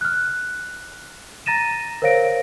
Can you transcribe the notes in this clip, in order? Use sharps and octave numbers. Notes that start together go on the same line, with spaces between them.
F6 F#6
A#5 A6 A#6 D#7 E7
A#4 C5 C#5 F5 A#6 D7